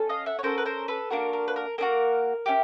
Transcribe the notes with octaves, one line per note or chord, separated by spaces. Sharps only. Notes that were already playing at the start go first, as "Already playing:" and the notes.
Already playing: C#4 A4
D#5 F5
E5 F#5
C#5
C#4 F#4 A4 A#4 C5
B4
A#4 C5
A4 B4
A#3 D4 F#4 A#4
A#4
B4
A#4
A#3 D4 F#4 A#4
C#4 E4 G4